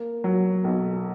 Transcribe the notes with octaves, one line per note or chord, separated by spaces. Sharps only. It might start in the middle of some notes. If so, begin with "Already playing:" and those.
Already playing: A#3
F#3
B1